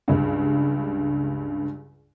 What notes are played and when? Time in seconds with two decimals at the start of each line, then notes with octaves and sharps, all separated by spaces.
0.08 C#2 G2